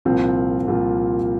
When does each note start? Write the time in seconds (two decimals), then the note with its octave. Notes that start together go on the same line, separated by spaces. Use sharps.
0.05 C2 A#2 F3 C4 F4
0.67 C2 A#2 F3 C4 F4